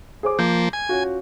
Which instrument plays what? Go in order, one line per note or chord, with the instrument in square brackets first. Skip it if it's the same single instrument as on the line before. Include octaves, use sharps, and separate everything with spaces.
[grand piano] G#4 C5 D6
[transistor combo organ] F3 A#3 [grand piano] G6
[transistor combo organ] G#5
[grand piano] C#4 F4 F#4